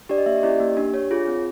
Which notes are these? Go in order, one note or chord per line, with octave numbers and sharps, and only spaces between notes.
D4 G4 D5
D#5
A#3 E5
D5
C#4 E4 G4 D#5
A#3
D4 G4
D4 C#5
F4 G#4
C4